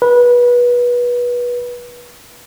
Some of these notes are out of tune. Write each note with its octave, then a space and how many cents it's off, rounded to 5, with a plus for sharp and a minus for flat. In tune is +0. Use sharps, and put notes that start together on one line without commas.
B4 -25